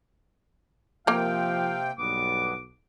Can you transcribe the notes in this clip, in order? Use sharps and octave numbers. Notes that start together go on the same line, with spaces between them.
C3 F3 A#3 A#4 F5 G5
B1 G2 B3 D6